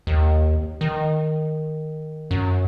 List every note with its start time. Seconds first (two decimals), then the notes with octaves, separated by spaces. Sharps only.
0.07 D#2
0.81 D#3
2.31 F#2